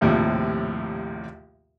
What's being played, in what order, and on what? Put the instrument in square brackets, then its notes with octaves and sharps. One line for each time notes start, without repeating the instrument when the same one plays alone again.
[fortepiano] A#1 D#2 A2 C3 F3